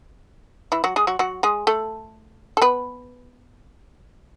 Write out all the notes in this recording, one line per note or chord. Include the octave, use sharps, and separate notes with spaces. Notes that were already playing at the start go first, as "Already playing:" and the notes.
E3 E4
F#3 F#4
G#3 G#4
F#3 F#4
F#3 F#4
G#3 G#4
A3 A4
A4
B3 B4